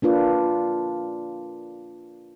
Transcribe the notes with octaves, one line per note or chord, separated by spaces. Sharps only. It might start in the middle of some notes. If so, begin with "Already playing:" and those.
A#3 D4 F4 B4